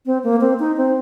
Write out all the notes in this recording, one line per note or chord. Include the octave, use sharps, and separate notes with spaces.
C4
A#3
C4
D#4
C4